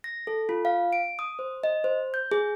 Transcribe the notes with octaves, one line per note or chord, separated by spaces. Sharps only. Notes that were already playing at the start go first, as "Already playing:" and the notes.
A#6
A4
F4
F5
D7
D#6
C5
D#5
C5
G6
G#4